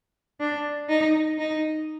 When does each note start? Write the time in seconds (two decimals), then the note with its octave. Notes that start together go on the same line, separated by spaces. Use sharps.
0.40 D4
0.89 D#4
1.39 D#4